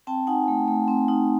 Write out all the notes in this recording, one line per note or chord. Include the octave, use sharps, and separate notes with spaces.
C4 G5 A5
D#4 F#5 G#5
A3
A3
C4
D#4